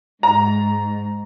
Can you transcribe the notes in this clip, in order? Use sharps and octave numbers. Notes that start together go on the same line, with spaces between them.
G#2 A#5